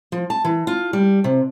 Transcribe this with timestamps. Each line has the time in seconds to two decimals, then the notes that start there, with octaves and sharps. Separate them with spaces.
0.12 F3
0.30 A5
0.44 E3
0.67 F4
0.93 G3
1.24 C3